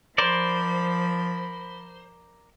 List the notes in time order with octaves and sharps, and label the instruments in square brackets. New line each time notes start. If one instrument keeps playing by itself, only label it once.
[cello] F3 [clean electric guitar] A#4 D5 [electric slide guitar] C5 [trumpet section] B5